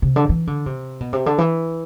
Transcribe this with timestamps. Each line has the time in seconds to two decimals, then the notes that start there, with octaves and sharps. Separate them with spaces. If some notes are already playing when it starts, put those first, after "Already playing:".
0.02 C3
0.16 D3
0.29 E3
0.47 D3
0.66 C3
1.01 B2
1.13 C3
1.26 D3
1.38 E3